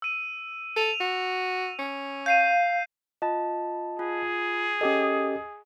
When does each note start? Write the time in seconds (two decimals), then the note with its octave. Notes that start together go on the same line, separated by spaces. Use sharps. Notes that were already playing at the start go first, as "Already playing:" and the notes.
0.02 E6 D#7
0.76 A4 D#7 F7
1.01 F#4
1.79 C#4
2.26 F5 G6 C7 D#7
3.22 F4 D#5 A5
3.99 F4 G#4
4.81 C#4 G4 A4 D#5 D#6